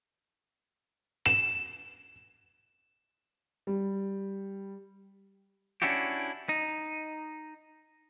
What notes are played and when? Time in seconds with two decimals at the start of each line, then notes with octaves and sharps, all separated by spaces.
1.26 E7
3.67 G3
5.82 C#4 D4 E4 F#4 G4
6.49 D#4